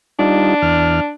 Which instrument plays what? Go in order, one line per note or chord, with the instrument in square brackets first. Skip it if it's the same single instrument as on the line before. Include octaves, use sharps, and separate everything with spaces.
[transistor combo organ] G3 D#4 F4 [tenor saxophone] D4
[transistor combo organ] E2 F6